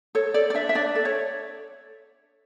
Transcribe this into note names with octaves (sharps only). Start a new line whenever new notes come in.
A4 C#5
A4 D5
D5
D4 E5
E5
D4 D5
A4
C#5